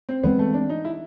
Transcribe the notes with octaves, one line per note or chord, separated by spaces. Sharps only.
C4
E3 G#3 B3 C4
A3
D4
D#4
E4